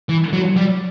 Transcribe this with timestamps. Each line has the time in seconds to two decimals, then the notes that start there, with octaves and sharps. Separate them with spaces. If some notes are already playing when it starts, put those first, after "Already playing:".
0.09 E3
0.33 F#3
0.57 G3